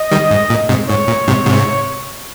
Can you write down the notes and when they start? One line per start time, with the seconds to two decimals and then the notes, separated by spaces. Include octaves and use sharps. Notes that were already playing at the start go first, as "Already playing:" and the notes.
Already playing: D#5
0.11 D#3 G3
0.31 G#2
0.50 A#2
0.69 G#2 C3
0.88 G#2 C#5
1.08 A#2
1.27 G#2 C3
1.46 G#2 C3